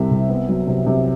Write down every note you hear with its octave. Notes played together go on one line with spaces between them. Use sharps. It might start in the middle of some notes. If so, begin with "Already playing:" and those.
Already playing: C2 C3 G3 E5
C2
B3
F#3
C3
C3